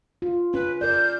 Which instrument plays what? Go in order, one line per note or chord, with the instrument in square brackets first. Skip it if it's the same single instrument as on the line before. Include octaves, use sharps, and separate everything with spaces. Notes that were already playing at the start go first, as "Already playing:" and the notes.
[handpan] F4
[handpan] C#4 [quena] B4
[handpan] A#4 D5 [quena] G6